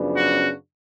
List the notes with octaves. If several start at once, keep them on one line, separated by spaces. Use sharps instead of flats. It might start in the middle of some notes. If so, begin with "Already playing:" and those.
Already playing: F#2 C#3 F3 B3 D4
F#4